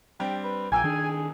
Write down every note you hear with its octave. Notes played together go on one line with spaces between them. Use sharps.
G3 C4 D4 G4
B4
A#1 A#3 G5 G#5 E6 G#6
D#3 D4 G#4